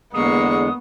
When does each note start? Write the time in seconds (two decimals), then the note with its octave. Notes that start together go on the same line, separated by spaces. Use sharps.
0.14 E2 D3 G#3 A#3 B3 C#6 D#6